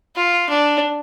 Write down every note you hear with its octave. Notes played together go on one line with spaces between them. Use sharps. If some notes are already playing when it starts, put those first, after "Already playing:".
F4
D4